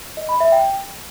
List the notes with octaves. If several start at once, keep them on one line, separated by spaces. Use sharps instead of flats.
D#5
B5
E5
G5